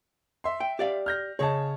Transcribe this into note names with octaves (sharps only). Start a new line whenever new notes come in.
E5 C6
G5
G4 D5 F5
F6 G6 A#6
C#3 G#4 C#5 D#5 A5